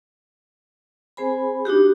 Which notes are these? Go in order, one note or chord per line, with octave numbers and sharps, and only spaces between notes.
C4 G#4 C5 G#5 B5
D4 D#4 F#4 G4